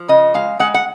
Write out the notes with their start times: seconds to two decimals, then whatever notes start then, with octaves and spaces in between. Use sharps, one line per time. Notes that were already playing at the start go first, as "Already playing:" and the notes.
Already playing: F3
0.08 C#3 D#5
0.34 G#3 F5
0.59 G#3 F#5
0.74 F#5